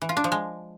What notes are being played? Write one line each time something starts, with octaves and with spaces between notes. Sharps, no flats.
E3
F4
D4
F3
G#3